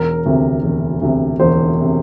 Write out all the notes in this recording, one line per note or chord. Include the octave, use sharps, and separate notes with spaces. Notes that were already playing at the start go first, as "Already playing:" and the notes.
Already playing: E1 A#4
D2 C3
E1
D2 C3
E1 C5
C3